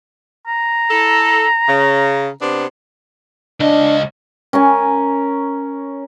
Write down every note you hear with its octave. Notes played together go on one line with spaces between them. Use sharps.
A#5
E4 A4
C#3
C3 B3 D4
C#2 D4 D#5
C#4 A#4 G#5